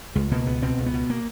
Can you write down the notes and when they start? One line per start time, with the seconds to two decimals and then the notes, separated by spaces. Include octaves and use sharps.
0.15 C#2 G#3
0.31 B2 A#3
0.46 C#2 B3
0.62 B2 C4
0.78 C#2
0.86 B3
0.93 B2
1.10 A#3